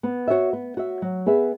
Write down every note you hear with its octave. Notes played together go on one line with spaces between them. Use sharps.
B3
F#4 C#5 E5
B3
F#4 C#5 E5
F#3
B3 G#4 B4 E5